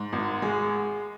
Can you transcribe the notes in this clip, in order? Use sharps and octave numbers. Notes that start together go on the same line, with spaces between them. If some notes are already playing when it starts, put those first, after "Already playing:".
Already playing: G#2
G#1
G#3